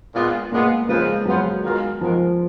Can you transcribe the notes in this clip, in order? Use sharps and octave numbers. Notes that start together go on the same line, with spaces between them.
A#2 G#3 B3 F4
A#2 G#3 A#3 B3 F4
C#3 F3 G#3 B3 F4 B4
C#3 F3 F#3 B3 F4 B4
D#3 G#3 B3 F4 A#4
D#3 F3 G#3 B3 F4 A#4